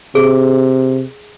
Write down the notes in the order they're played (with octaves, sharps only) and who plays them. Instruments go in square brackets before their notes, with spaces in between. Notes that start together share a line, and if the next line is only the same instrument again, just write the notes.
[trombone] C3 [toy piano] G#4